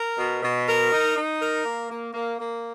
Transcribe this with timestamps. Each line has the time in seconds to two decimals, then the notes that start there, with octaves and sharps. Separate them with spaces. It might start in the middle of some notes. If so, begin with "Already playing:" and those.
Already playing: A#4
0.18 B2
0.43 B2
0.67 A#4
0.92 D#4
1.16 D#4
1.40 A#4
1.65 A#3
1.90 A#3
2.14 A#3
2.39 A#3